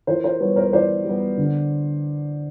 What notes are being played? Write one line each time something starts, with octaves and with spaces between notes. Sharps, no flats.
E3 A#4 C5
A#4 C5
G3 B3 B4 C#5
A#4 C5
E3 C5 D5
G3 B3
D3